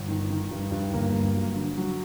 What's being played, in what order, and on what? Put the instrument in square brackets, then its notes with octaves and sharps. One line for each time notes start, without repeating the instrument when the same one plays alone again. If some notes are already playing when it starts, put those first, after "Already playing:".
Already playing: [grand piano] G1
D#3
D#3
G2
G2
G1 A#3
G2
F#3
D3
F#3